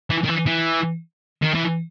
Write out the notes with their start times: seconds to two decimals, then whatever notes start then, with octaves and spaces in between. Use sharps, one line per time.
0.10 E3
0.24 D#3
0.28 E3
0.46 E3
1.42 D#3
1.54 E3